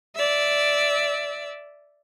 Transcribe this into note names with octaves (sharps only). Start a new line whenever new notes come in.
D5 E5